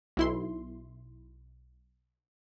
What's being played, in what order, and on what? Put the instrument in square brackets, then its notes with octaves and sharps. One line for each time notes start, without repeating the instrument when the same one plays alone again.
[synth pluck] B1 E4 C6